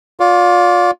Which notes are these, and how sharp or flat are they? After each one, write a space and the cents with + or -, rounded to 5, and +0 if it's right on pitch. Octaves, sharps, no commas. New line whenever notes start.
F4 +25 D5 -25